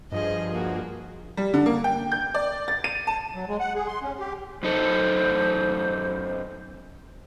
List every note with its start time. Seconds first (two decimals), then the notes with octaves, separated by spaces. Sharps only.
0.12 G2 F3 G#4 D#5
0.53 A#3 F#4
1.37 G3
1.54 D3
1.66 A#3
1.84 G5
2.12 G6
2.35 D5
2.68 A6
2.84 D#7
3.07 A5
3.35 F#3
3.48 G#3
3.60 F#5
3.75 G#4
3.88 C6
4.03 C#4
4.19 G4
4.63 F#2 D#4 A4 C5